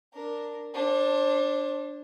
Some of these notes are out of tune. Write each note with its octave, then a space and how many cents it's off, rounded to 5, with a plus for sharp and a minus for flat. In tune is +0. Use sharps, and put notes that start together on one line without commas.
D4 +0 A#4 +0
D4 +0 C5 +40